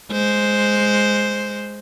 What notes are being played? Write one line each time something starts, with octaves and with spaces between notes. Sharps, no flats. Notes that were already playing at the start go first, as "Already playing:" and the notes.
G#3 C5